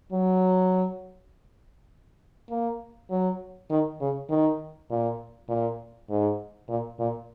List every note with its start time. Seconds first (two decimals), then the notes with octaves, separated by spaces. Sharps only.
0.12 F#3
2.50 A#3
3.11 F#3
3.70 D#3
4.01 C#3
4.30 D#3
4.90 A#2
5.49 A#2
6.10 G#2
6.69 A#2
6.99 A#2